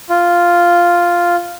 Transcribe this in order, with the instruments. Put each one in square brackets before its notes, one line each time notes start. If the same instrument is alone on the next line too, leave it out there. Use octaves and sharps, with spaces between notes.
[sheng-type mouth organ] F4